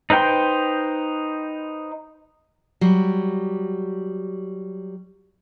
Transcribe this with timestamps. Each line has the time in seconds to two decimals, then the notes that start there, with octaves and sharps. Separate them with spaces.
0.10 D#4 B4 C5 G5 C6
2.81 F#3 G3